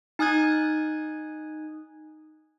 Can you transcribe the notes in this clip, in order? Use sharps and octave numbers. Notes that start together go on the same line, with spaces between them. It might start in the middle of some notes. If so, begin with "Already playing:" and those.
D#4 G#5 D#6 F#6 G#6